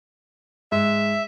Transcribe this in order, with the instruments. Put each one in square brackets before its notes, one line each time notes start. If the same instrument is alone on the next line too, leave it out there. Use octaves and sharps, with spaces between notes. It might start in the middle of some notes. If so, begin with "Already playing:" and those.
[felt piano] G#2 [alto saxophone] E5